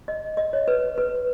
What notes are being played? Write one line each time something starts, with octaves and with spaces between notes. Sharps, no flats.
D#5
D#5
C#5
B4
B4